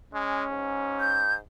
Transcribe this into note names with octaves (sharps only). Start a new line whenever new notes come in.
G#3 C#4
G#2
G6